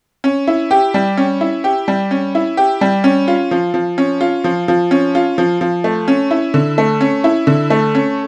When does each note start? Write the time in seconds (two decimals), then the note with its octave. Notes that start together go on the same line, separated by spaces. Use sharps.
0.24 C#4
0.47 E4
0.71 G4
0.94 G3
1.17 C#4
1.41 E4
1.64 G4
1.88 G3
2.11 C#4
2.35 E4
2.57 G4
2.81 G3
3.04 C#4
3.28 F4
3.51 F3
3.74 F3
3.98 C#4
4.21 F4
4.44 F3
4.68 F3
4.91 C#4
5.15 F4
5.38 F3
5.61 F3
5.84 A3
6.08 C#4
6.31 E4
6.54 D3
6.78 A3
7.01 C#4
7.24 E4
7.47 D3
7.70 A3
7.95 C#4